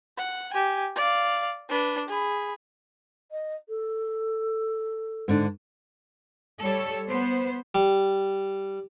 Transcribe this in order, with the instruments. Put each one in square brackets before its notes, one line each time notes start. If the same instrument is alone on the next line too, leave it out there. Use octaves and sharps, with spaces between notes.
[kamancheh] F#5
G4 G#5
D5 F5
D4 B4
G#4 B5
[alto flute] D#5
A4
[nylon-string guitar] G#2 D3 D4
[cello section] G3 A4 C#5
B3 C5
[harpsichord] G3